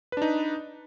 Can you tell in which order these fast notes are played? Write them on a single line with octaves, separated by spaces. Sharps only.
B4 D4 D#4